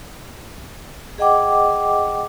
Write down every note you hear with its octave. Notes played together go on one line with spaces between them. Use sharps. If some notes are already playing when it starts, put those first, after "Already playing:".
G#4 D#5 F#5 G5 D6